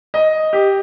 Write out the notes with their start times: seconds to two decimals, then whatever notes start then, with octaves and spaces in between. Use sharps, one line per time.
0.14 D#5
0.53 G4